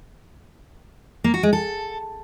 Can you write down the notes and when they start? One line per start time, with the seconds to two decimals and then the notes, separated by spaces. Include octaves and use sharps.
1.24 A#3
1.34 F#4
1.43 G#3
1.53 A4